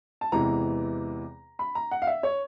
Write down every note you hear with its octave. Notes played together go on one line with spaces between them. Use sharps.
A5
E2 C3 E3 G#3 A#5
B5
A#5
F#5
F5
E5
C#5